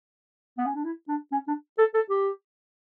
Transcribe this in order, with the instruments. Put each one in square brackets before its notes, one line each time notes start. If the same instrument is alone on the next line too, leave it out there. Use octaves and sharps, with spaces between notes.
[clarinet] B3
C#4
D4
E4
D4
C#4
D4
A4
A4
G4